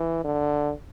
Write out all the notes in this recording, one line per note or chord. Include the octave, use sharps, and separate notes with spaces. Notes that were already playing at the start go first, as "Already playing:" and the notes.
Already playing: E3
D3